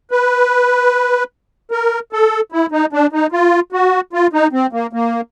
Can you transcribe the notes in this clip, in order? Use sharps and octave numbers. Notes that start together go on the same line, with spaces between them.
B4
A#4
A4
E4
D#4
D4
D#4
F4
F#4
F4
D#4
C4
A#3
A#3